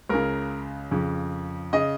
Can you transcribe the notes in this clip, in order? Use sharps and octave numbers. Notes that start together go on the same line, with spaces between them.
C#2 C#3 A#4
F2 C#3
C#3 D#5